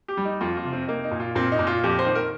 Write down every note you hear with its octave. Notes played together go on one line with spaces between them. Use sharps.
G4
G3
D#4
F2 F4
F4
C3
C4
A#3 D#4
D#4
A#2
F4
A#2 C4
D#4
A#2
F4
F2 G4
C5
D#3
A#4